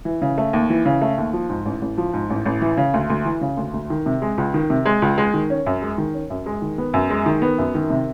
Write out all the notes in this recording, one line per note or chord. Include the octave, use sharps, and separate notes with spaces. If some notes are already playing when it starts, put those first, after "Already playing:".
E3
C#3
A3
D#2
E3
C#3
A3
D#2
F3
G#2
A1
A1
F3
G#2
A1
A1
E3
C#3
D2
D2
E3
C#3
D2
D2
D#3
C3
G#3
C#2
D#3
C3
G#3
C#2
G#3
D#3
C#4
F#2
G#3
D#3
C#4
F#2
G#3
D#3
B3
F#2
G#3
D#3
B3
F#2
D#3
C3